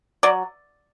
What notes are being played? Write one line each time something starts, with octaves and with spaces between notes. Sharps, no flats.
F#3 D5